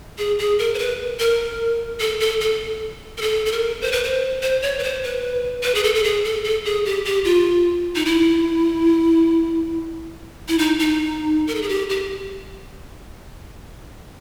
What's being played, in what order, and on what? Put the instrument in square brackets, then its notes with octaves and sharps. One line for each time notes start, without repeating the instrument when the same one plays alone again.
[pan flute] G#4
G#4
A#4
C5
B4
A#4
A4
A4
A4
A#4
A4
A4
A#4
C5
B4
C5
C5
C#5
B4
C5
B4
B4
G#4
A4
A4
G#4
A4
A4
G#4
G4
G4
F4
D#4
E4
E4
D#4
D#4
A#4
A4
G#4
G4
G4